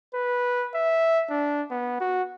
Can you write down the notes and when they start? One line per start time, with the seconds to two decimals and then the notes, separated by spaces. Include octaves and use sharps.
0.14 B4
0.75 E5
1.30 D4
1.71 B3
2.01 F#4